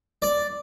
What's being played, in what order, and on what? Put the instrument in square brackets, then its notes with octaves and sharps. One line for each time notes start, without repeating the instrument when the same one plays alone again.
[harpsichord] D5